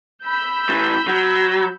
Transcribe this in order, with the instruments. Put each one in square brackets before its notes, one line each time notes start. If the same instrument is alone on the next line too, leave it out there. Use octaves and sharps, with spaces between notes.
[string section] B5 E6 G6
[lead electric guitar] A2 E3
F#3